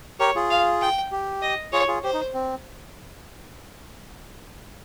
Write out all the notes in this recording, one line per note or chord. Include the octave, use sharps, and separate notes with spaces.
G4 A#4 C#5
F4 G#4
F5
G5
G4
D#5
F4 G#4 C#5
F4 G#4
G4 C5
D#4
C4